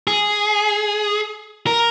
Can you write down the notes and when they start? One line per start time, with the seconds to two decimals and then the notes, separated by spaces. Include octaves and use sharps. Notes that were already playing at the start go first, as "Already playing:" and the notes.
0.07 G#4
1.67 A#4